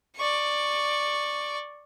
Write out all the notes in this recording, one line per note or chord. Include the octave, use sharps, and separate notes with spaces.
D5 C#6